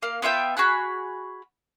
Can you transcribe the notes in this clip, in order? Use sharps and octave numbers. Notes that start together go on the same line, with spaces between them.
A#3 F5
B3 F4 E5 G5
F#4 G#4 B5 F#6